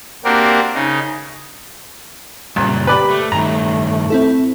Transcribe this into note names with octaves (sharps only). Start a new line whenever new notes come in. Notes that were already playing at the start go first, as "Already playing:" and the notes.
A#3 C4 D4 F#4 G4 A#4
C#3 D#4
C2 F#2 A#2 C#3
G4 B4 D5 B5
A3
G2 D#3 F#3 A3 A#5
C4 E4 A4